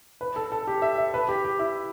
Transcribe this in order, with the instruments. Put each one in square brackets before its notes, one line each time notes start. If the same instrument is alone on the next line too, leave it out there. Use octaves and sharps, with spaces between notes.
[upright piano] B4
A4
A4
G4
E5
E5
B4
G4
G4
E4